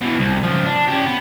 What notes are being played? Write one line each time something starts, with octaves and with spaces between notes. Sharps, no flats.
B2 E3
C2
C#2 F3
D4
C#4 G4
B3